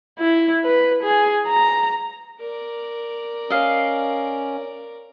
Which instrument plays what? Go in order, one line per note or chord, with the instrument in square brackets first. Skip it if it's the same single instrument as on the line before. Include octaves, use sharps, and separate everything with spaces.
[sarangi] E4
B4
G#4
A#5
[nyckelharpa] A#4 D5
[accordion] C#4 [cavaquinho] D#5 F5